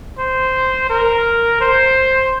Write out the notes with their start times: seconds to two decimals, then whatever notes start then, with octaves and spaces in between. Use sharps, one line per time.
0.19 C5
0.90 A#4
1.61 C5